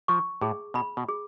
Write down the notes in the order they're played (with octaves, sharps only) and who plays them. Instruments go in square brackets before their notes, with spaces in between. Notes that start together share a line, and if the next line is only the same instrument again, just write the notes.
[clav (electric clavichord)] F3 [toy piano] C#6
[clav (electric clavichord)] A2 [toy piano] G#4
[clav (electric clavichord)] B2 [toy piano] B5
[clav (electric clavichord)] B2
[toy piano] G#4